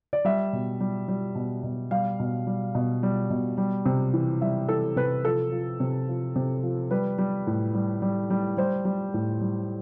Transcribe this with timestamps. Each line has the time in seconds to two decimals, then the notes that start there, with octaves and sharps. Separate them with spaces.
0.13 D5
0.25 G3 E5
0.53 B2
0.80 G3
1.08 G3
1.35 B2
1.64 B2
1.91 G3 F5
2.20 B2
2.47 G3
2.75 B2
3.03 G3
3.30 B2
3.58 G3
3.86 C3
4.14 E3
4.41 G3 E5
4.69 E3 A4
4.96 C3 B4
5.25 F3 A4
5.52 F3
5.80 C3
6.08 F3
6.36 C3
6.63 F3
6.91 G3 B4
7.18 G3
7.47 A2
7.75 G3
8.02 G3
8.30 G3
8.57 G3 C5
8.85 G3
9.14 A2
9.41 G3